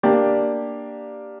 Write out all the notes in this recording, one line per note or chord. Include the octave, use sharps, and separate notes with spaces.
A#3 D4 G4 D5